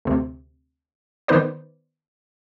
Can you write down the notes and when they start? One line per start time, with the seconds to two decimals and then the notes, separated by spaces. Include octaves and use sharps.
0.05 D2 C3
1.28 D#3 B3 D#4 B4 C5 D5